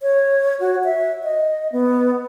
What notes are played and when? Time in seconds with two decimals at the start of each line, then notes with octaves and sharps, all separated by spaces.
0.02 C#5
0.60 F#4
0.84 E5
1.24 D#5
1.72 B3